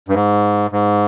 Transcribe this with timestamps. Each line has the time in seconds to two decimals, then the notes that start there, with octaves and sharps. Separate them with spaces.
0.08 G2
0.14 G#2
0.72 G#2